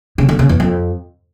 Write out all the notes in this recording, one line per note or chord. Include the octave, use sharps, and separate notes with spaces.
C#3
D3
C#3
E2
F2